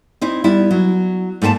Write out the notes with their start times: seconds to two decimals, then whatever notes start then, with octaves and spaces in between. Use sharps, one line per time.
0.21 C4 D#4 E4
0.44 G3 B3 E4
0.71 F#3
1.42 G#2 A3 A#3 G5 A5